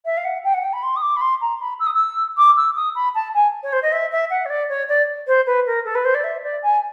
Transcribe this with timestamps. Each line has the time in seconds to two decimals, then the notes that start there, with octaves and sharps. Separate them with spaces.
0.06 E5
0.17 F5
0.25 F#5
0.44 G5
0.54 F#5
0.64 G5
0.73 B5
0.83 C6
0.96 D#6
1.02 D6
1.16 B5
1.21 C6
1.41 A#5
1.60 B5
1.80 E6
1.87 D#6
1.94 E6
2.37 D6
2.57 E6
2.76 D#6
2.95 B5
3.15 A5
3.34 G#5
3.63 C#5
3.73 C5
3.82 D#5
3.92 E5
4.12 E5
4.30 F#5
4.45 C#5
4.50 D5
4.69 C#5
4.89 D5
5.27 C5
5.47 B4
5.66 A#4
5.85 A4
5.95 B4
6.05 C5
6.14 D5
6.24 E5
6.43 D5
6.63 G#5